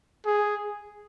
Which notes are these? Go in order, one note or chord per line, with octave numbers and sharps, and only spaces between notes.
G#4